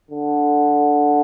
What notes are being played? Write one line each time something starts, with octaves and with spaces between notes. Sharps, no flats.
D3